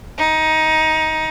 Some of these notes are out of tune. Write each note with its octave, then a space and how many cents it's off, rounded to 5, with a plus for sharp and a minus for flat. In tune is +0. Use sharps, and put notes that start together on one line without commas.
D#4 +15